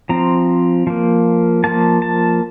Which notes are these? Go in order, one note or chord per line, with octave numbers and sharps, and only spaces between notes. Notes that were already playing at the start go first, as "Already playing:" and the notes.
F3 C4 A#5
F3 A#3
F3 A#3 A5
A5